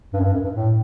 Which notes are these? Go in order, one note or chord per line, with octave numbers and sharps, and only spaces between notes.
G2
F#2
G2
F#2
G2
A2